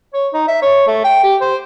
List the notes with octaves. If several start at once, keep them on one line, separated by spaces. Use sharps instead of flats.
C#5
D#4
E5
C#5
A3
G5
G4
C5